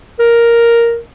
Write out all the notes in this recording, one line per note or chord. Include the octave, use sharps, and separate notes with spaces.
A#4